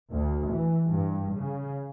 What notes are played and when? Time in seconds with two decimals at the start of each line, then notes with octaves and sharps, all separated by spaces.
0.11 D2
0.52 E3
0.89 G2
1.38 C#3